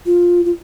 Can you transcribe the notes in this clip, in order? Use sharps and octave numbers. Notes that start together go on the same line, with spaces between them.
F4
F4